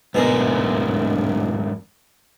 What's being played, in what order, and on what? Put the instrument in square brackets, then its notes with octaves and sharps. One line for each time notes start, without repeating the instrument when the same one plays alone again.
[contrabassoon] D1 [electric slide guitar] F2 G#2 A#4 [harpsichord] B2 G#4